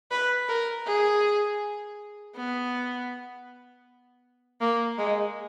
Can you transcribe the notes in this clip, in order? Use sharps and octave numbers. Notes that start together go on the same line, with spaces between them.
B4
A#4
G#4
B3
A#3
G#3